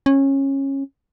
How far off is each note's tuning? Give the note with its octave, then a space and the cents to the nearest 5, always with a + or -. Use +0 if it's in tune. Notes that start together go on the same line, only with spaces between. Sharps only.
C#4 -20